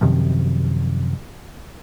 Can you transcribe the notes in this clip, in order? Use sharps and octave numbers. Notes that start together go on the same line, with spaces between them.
F#2 C3 D#3 F3